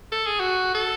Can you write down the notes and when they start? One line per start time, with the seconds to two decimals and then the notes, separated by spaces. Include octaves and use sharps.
0.12 A4
0.26 G#4
0.40 F#4
0.75 A4